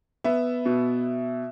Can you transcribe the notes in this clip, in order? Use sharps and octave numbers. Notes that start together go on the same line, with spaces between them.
B3 E5
B2